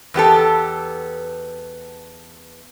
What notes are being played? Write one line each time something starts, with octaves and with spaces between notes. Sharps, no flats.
E2 B3 G4 A4